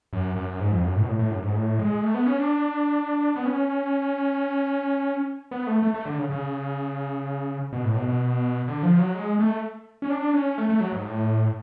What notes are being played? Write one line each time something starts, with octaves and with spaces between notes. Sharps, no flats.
F#2
F#2
G#2
F2
F#2
A2
B2
A2
A2
F#2
G#2
A2
G#3
A3
B3
C#4
D4
B3
C#4
B3
A3
A3
A3
D3
C#3
C#3
B2
A2
B2
B2
D3
F3
F#3
G#3
A3
C#4
D4
C#4
A3
A3
F#3
G#2
A2